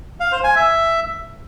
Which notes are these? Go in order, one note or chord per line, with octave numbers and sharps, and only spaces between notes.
F5
C5
G#5
E5